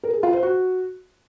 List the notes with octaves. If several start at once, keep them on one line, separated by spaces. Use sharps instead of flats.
A#4
G#4
F4
C5
F#4